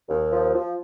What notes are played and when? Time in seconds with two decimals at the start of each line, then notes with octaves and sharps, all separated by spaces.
0.09 D#2
0.31 F3
0.53 F3